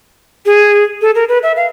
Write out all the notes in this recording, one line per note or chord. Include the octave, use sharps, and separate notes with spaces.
G#4
A4
A#4
B4
E5
F5